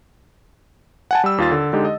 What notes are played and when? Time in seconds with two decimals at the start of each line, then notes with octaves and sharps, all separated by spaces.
1.11 F#5 G#5 A5
1.24 G3 E6
1.38 D#2 F4 A6
1.51 D3
1.73 D3 G#3 D#4 G4
1.85 D#5